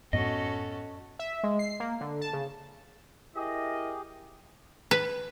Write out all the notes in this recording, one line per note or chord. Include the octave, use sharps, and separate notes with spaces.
F#2 A2 B3 C#4 F#4 A4 D#5
E5
G#3
C7
A#3
D3
A5
C#3
E4 G4 G#4 A#4 D#5
B4